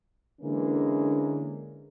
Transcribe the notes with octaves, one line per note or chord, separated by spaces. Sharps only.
D3 E3 G#3 A#3 C#4